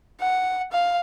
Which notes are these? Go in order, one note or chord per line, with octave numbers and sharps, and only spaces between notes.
F#5
F5